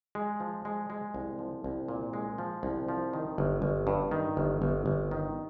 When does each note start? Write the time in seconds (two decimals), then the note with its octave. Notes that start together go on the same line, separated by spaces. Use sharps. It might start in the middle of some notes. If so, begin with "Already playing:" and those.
0.15 G#3
0.40 F3
0.65 G#3
0.90 G#3
1.14 C2
1.39 F3
1.64 C2
1.88 A#2
2.13 G#3
2.38 F3
2.63 C2
2.89 F3
3.13 D#3
3.38 G1
3.62 G1
3.87 G2
4.11 D#3
4.37 G1
4.62 G1
4.86 G1
5.11 D#3